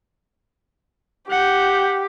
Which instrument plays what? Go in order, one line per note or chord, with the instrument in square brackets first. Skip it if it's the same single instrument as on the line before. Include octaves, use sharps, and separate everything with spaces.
[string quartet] G4 [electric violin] F#5 G6